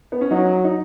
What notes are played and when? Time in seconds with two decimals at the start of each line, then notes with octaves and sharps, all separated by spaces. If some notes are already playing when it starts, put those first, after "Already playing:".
0.12 B3
0.21 C#4
0.31 F#3 D#4
0.64 D#4